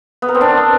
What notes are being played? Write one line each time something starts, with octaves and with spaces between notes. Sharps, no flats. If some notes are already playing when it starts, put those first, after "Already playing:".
B3
A#4
C4
D4